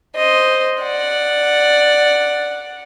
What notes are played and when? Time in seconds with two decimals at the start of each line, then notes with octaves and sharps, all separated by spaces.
0.14 C5 D#5
0.81 D5 F#5